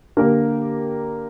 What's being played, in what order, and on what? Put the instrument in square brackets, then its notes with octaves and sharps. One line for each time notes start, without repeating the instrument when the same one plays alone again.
[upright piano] D3 A#3 G4 A#4